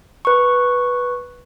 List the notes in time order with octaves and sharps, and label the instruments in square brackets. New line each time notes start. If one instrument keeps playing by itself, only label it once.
[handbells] B4 C#6